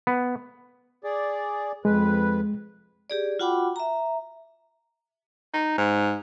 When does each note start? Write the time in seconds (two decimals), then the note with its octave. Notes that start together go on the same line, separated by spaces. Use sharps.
0.07 B3
1.04 G#4 D5
1.85 F2 G#3 B4
3.10 G4 G#4 D5
3.39 F4 F#4 F#5 G5 B5 D6
3.76 E5 A#5
5.54 D#4
5.78 G#2